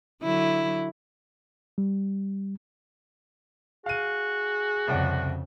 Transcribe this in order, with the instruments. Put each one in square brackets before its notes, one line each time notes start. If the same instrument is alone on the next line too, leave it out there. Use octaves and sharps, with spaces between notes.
[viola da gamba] D3 F#3 E4
[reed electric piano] G3
[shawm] F#4 [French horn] G#4 [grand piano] F5 D#7
[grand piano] C2 D5 F#5 [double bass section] F2 C#3